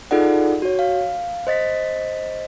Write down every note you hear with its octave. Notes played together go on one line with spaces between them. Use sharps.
D#4 F4 G#4 A4 D5 F#5
F#4 C#5
F5
C5 D#5 A6 B6